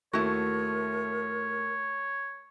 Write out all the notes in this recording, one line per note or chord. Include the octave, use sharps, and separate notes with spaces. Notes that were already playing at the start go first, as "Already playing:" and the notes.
D#2 A3 E4 F#4 A#4 C#5